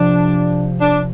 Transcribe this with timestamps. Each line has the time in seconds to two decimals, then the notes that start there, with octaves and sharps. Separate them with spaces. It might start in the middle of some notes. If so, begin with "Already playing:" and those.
Already playing: C3 F3 C4 D4 G4
0.80 D4